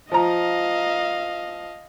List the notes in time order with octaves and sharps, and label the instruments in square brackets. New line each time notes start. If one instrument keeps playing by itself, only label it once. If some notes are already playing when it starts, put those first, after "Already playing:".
[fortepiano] F3 A#5 [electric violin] D#5 F5